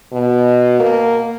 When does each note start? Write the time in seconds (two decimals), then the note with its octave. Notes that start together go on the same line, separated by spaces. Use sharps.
0.12 B2
0.80 A#3